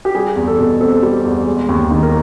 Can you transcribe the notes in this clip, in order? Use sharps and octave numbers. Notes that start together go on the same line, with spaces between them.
G4
G3 G#4
E2
A4
B2
C4 A4
G3
E2
G#3
D#2
D#3
A#4